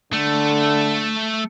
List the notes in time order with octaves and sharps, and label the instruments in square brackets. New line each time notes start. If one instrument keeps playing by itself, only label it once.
[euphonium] D3 [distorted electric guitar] A3